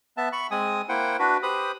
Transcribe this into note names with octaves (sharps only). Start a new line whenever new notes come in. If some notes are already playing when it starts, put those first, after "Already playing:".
B3 E5 A5
B5 C#6
G#3 C4 G#5 D#6
A#3 E4 C5 F#5 G5
D4 F#4 B4
G4 B4 C5 B5 D#6